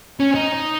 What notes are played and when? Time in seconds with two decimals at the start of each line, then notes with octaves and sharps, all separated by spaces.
0.20 C#4
0.35 D#4